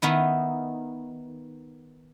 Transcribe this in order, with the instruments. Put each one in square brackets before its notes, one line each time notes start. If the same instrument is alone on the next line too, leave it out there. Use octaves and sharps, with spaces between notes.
[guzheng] D#3 B3 D#4 E4